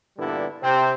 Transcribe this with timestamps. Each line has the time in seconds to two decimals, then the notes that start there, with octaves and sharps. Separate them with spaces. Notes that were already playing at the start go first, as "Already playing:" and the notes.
0.19 G2 A#2 D3 G3 B3 E4
0.63 C3 C4